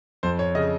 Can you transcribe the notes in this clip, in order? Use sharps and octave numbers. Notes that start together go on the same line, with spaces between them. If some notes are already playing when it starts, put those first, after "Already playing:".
F2 C5
C#5
C#3 D#5